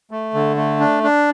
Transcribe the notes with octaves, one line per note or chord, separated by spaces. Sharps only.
A3
D3
A3
D4
D4